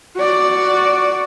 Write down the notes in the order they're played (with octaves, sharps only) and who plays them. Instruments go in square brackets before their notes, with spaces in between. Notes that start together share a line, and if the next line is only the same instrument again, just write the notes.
[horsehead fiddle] F#4 D5